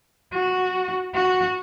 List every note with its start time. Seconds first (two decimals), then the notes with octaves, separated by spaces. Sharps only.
0.33 F#4
1.15 F#4